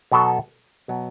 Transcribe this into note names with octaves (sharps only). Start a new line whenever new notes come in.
B2 F#3 B3 F#4 A4
B2 F#3 B3